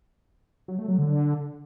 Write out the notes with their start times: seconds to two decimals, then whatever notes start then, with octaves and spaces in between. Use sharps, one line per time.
0.68 F#3
0.78 A3
0.88 F#3
0.98 D3